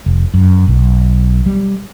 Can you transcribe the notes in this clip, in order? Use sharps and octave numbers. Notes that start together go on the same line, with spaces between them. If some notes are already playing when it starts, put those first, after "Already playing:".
F1
F#2
B1
G3